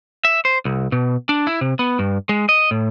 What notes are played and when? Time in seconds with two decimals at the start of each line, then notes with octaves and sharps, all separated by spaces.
0.25 E5
0.45 C5
0.65 C2
0.92 B2
1.29 D4
1.47 E4
1.61 C3
1.79 B3
1.99 G2
2.29 G#3
2.49 D#5
2.71 A2